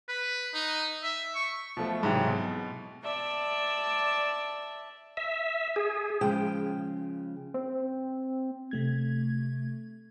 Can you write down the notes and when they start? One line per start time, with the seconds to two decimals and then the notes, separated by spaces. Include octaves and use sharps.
0.08 B4
0.54 D#4
1.03 E5
1.35 C#6
1.77 B2 F3 A3
2.03 G#2 C3 E3 F#3 G#4 G5
2.27 B2
3.03 D5 E5 A5
5.17 E5
5.76 G#4
6.21 C#3 F3 G#3 G5
7.54 C4
8.71 C3 A3 G#6